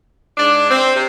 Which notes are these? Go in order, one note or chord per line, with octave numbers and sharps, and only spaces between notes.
G#2 D4
C4
C3